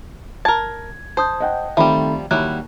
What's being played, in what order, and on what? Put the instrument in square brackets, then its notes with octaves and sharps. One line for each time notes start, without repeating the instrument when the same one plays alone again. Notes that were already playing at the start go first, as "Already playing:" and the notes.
[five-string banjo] A#4 A5 [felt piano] G#6
[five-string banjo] C5 [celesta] A5 D#6 G6
[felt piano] D#5 F#5 G5
[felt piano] D#3 A3 C4 [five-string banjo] F3 G3 [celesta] E5 B5
[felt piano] D#2 [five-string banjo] F#3 G3 E4 [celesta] F#6